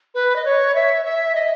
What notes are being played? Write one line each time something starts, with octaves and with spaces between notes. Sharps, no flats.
B4
D#5
C#5
E5
E5
D#5